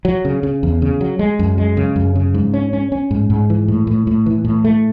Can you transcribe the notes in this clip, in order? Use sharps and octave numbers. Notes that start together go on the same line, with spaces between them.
F#3
C#3
C#3
E2
C#3
F#3
G#3
F#2
G#3
C#3
F#2
C#3
G#2
C#4
C#4
C#4
G#2
G#2
E3
A2
A2
A2
E3
A2
A3